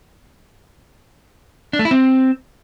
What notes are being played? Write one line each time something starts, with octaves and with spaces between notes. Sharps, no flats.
D4
A3
E4
C4